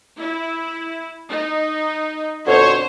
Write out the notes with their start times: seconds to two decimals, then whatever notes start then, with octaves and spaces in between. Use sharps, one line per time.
0.18 E4
1.29 D#4
2.47 F2 B2 D3 C5 C#5